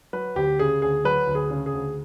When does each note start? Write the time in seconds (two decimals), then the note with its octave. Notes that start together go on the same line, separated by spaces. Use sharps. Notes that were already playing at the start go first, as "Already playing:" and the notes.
0.13 F#3 B4
0.36 D2 G4
0.59 C#3 G#4
0.82 D2 G#4
1.04 F#3 B4
1.27 D2
1.35 G#4
1.50 C#3
1.66 G#4
1.73 D2